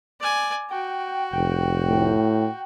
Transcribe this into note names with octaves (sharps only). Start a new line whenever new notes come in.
D5 G#5
F#4 G5
F1 G5
A2